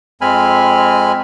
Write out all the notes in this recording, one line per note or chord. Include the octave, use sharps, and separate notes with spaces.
F2 G#3 C4 G#5 B5 F6